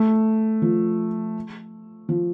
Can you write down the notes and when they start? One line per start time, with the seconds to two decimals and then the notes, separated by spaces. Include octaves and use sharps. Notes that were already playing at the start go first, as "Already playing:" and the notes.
Already playing: A3
0.62 F3
2.09 F3